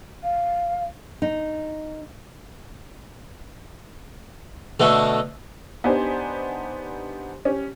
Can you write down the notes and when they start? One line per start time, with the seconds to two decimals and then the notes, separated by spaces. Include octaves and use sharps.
0.23 F5
1.22 D#4
4.80 B2 D3 A3
5.84 B3 D4 D#4 G4 C5 G#5
7.45 C#4 G4